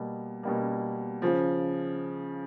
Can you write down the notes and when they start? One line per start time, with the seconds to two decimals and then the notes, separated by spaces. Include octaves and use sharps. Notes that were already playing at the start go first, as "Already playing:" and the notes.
Already playing: B2 G3 A#3
0.43 B2 G3 A#3
1.22 C#3 F3